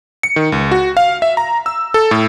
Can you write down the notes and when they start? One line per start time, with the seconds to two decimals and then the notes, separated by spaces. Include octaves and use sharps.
0.23 C#7
0.36 D#3
0.52 C#2
0.71 F#4
0.97 F5
1.22 E5
1.37 A#5
1.66 E6
1.94 A4
2.11 A2